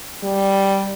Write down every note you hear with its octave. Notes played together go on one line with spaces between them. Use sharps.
G3